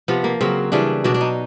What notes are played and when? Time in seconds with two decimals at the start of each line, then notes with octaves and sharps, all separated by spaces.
0.08 C3 F3 B3
0.24 A#3
0.41 C#3 F#3 C4
0.72 C#3 E3 G3 D4
1.04 B2 F#3 D4
1.14 D4
1.21 D#4